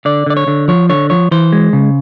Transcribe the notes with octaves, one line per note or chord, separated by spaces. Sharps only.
D3 D5
D3 D5
C#5
D3
F3 C#5
D3 C#5
F3 C#5
E3 C5
G#3
C#3